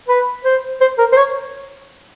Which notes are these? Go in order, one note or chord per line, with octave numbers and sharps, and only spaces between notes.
B4
C5
C5
A#4
C5
C#5